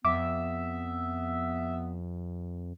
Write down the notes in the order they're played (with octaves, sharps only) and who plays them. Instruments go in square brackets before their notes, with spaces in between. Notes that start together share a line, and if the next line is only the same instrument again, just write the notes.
[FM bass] F2 [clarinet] B3 [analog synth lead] E5 [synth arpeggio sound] D6